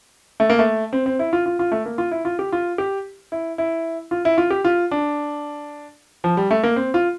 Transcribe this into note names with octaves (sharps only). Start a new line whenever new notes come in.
A3
A#3
A3
C4
C4
E4
F4
F4
F4
A3
A#3
F4
E4
F4
G4
F4
G4
E4
E4
F4
E4
F4
G4
F4
D4
F3
G3
A3
A#3
C4
F4